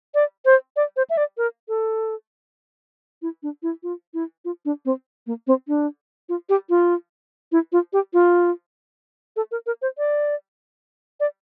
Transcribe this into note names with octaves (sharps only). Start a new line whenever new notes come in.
D5
C5
D5
C5
E5
D5
A#4
A4
E4
D4
E4
F4
E4
F4
D4
C4
A#3
C4
D4
F4
G4
F4
E4
F4
G4
F4
A4
A#4
A#4
C5
D5
D5